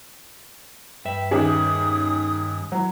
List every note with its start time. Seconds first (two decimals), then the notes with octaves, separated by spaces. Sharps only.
1.05 G2 B4 E5 G5
1.31 D#2 C#4 G#4 D#6
2.72 F#3 E4